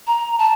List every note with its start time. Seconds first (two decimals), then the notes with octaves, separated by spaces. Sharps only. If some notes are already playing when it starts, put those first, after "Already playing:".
0.07 A#5
0.39 A5